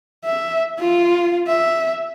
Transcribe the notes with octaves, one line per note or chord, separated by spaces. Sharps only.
E5
F4
E5